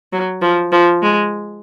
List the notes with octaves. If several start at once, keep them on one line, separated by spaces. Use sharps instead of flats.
F#3
F3
F3
G#3